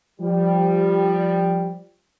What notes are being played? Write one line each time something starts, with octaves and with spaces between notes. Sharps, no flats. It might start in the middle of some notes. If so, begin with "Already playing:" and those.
F3 G3